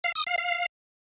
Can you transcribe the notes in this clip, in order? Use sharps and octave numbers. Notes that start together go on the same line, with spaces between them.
F5
D#6
F5
F5